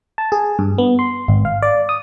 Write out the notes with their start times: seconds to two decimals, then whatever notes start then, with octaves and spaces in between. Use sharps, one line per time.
0.18 A5
0.32 G#4
0.59 G2
0.78 B3
0.99 C6
1.28 G#1
1.45 F5
1.62 D5
1.89 D#6